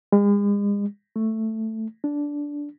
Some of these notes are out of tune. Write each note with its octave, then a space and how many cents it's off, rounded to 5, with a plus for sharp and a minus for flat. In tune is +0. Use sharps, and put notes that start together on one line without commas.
G#3 -40
A3 +5
D4 -10